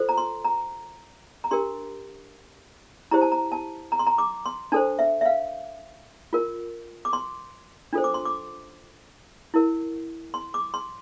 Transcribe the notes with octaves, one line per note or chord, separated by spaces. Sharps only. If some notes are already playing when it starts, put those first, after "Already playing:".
Already playing: F4 A4 C5
A#5
C6
A#5
A#5
D4 G4 A#4 C6
E4 G4 C5 A#5
A5
A#5
A5
A#5
C6
A#5
D6
C6
D4 A4 C5 A5
E5
E5
F5
F4 A#4
D6
C6
D4 F4 A4 C5
D6
C6
D6
E4 A#4
C6
D6
C6